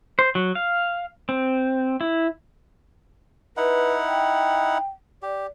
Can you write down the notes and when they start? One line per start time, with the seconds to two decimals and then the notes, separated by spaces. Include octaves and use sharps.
0.19 C5
0.35 F#3
0.55 F5
1.29 C4
2.01 E4
3.57 D#4 E4 B4 F#5
4.06 G5
5.22 G4 D5